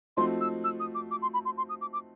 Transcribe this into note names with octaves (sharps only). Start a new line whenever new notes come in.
F3 A3 C4 D#4 F#4 C6
E6
E6
D#6
D6
D6
C6
B5
C6
C6
D#6
D6
D6